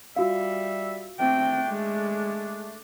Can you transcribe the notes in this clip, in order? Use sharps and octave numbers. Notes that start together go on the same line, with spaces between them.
G3 F4 F#4 E5 F5
A3 C4 D4 G5
G#3